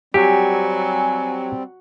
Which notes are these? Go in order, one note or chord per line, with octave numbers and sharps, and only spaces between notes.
F#3 G3 C4 G4 G#5